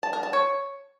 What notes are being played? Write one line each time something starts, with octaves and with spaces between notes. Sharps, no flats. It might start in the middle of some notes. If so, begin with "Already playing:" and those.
A5
A#4
A5
C#5